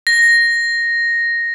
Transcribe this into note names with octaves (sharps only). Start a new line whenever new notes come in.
A#6